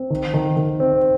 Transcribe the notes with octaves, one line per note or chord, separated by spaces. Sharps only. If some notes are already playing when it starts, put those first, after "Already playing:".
Already playing: C4
D#3
D#3
D#3
C4